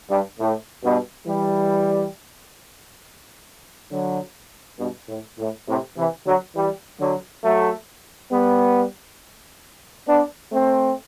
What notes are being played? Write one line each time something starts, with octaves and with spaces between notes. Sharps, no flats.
G2
A2
G2 B2
E3 G3
D3 F#3
G2 B2
A2
A2
A2 C3
C3 E3
D3 F#3
E3 G3
D3 F#3
F#3 A3
G3 B3
B3 D4
A3 C4